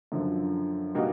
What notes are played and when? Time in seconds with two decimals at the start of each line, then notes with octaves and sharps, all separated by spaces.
0.12 F#2 D3 F3
0.95 B2 G3 A#3 D#4 F#4